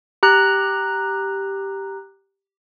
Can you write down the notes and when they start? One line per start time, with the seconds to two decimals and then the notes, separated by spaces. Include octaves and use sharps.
0.23 G4 A#5 F#6